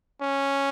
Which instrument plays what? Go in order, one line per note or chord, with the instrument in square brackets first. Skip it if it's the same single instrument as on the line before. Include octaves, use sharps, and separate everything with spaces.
[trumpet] C#4